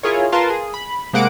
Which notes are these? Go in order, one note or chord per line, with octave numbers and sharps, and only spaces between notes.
E4 F4 G#4 A#4 C#5
F4 A#4 B4 F5 A5 C6
G#4
B5
C3 G#3 A#3 F#5 D6 D7